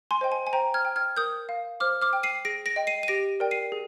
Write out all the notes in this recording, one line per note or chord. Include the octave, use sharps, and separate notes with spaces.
G#5 C6
C5 D#5 G5
G#5
G#5
C5 G5 A#5
F6 G#6
G5
F6 G#6
A#4 D#6 G6
F5
C5 D6 F6
D6 F6
G5
C7 D#7
G#4 A#6 D7
A#6 D7
D#5 G5
C7 D#7
D#7
G4 A#6 D7
A#4 D5 G5
C7 D#7
G#4